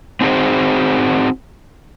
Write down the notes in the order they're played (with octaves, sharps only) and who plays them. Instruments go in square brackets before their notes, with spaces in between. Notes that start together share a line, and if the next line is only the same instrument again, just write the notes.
[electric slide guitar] C4 D#4 F#4 G#4 C5